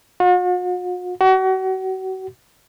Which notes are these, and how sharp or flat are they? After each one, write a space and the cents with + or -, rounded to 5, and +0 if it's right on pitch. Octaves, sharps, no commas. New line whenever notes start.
F#4 -45
F#4 +35